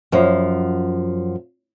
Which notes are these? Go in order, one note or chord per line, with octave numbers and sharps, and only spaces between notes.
F#2 F3